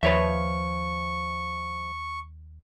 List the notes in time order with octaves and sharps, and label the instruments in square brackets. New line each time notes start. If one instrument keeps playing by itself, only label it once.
[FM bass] D#2 [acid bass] F3 [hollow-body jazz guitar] B4 C#5 E5 [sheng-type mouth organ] C#6